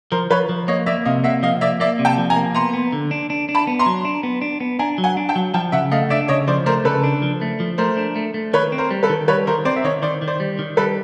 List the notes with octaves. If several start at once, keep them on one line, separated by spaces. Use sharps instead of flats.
F3 A#4 C5
F3 B4 C#5
F3
A#3 C#5 D#5
A#3 D5 E5
C3 D#5 F5
A#3 E5 F#5
F3 D#5 F5
A#3 D5 E5
A#3 D5 E5
C3
G5 A5
F3
G#5 A#5
A#3
B3 A#5 C6
B3
D3
D4
D4
D4
A5 B5
B3
A#5 C6
F#3
D4
B3
D4
B3
D4 G#5 A#5
F#3
F#5 G#5
D4
G5 A5
F#3
F3 G5 A5
C#3 E5 F#5
A3 D#5 F5
D4 D5 E5
C#3 C#5 D#5
F3 C5 D5
A3 A#4 C5
C#3 A4 B4
D4
F3
A3
F3
A3 A#4 C5
D4
A3
A3
D#3 B4 C#5
C4
A#4 C5
G3
A4 B4
D#3
G3 B4 C#5
D#3 A#4 C5
C4 C5 D5
E5
D#3 C#5 D#5
D#3 C5 D5
D#3
C5 D5
G3
D#3
G3 A4 B4